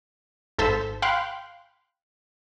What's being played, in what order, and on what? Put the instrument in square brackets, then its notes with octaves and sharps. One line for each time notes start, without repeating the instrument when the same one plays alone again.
[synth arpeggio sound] G#1 A4 C5 B6 E7
F5 G5 B5 C6 F#6